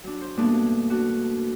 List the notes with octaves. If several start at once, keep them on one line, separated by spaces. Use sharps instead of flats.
F#3 D4
C5
G2 B2 A3 A#3 D4
G2
D4 F#4